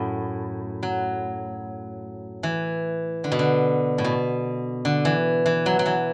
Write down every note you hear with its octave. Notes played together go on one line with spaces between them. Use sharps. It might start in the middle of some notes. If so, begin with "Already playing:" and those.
Already playing: F#2 A2
F#3
E3
D3
B2
D3
A2
B2
D3
E3
E3
F#3
F#3
E3